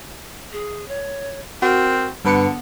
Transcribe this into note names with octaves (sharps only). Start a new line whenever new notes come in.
G#4
C#5
C4 F#4 A#4
G2 D3 B3 B4 C#7